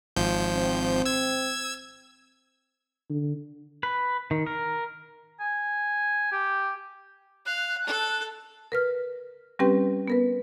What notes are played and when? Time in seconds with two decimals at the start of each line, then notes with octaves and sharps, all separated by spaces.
0.16 G#1 F3 G6
0.56 C4
1.05 E6 G#6
3.09 D3
3.83 B4
4.31 D#3
4.47 A#4
5.40 G#5
6.32 G4
7.46 F5 F#6
7.86 A4 A5
8.72 A#4 B4 F6
9.59 G3 C4 C#4 G4 B4 G5
10.08 B3 A#4 B4